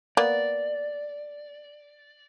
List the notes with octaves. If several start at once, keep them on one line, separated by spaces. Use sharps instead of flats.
A#3 B3 D5